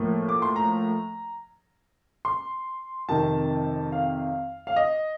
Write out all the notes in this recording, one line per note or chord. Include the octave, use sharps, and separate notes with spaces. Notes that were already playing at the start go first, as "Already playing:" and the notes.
Already playing: A2 F3 A#3
D6
C6
A#5
C6
F2 C3 D#3 A5
F5
F5
D#5